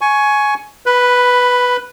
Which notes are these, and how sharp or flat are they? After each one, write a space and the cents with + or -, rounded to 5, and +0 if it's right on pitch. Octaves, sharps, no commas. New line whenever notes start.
G#5 +15 C#6 +0
B4 +0 B5 +20